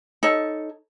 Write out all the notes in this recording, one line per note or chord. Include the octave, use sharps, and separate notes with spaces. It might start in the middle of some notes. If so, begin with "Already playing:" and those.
D#4 A4 C#5